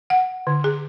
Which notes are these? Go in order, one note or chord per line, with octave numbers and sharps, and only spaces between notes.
F#5
D3
G#4